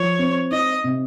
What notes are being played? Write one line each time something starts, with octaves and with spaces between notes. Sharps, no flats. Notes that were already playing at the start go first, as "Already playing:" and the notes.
Already playing: F3 C#5
C4
D#4 D#5
C3